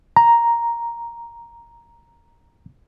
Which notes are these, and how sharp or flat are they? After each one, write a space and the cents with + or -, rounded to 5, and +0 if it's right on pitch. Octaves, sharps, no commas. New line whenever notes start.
A#5 +5